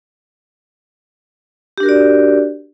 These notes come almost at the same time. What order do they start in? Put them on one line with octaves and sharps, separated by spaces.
G4 D4 A#4 F#4 D5